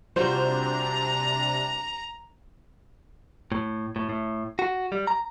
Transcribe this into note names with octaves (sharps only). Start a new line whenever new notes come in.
C3 G3 D4 F4 F#4 C5 A#5
A2
A2
A2
F#4
G3
A#5